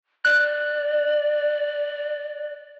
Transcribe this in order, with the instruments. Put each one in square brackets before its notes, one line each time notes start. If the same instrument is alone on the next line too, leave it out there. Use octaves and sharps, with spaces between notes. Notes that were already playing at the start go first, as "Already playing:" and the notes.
[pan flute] D5 [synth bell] F#6